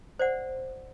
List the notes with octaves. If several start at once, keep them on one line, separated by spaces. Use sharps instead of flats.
C5 D5 F#5